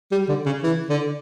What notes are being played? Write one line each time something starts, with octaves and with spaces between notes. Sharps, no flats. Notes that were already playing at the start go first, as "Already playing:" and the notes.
G3
D3
C#3
E3
D3